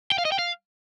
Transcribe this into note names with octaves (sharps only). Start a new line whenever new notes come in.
G5
F5
D#5
G5
F5